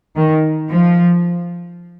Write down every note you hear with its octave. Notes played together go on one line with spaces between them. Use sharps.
D#3
F3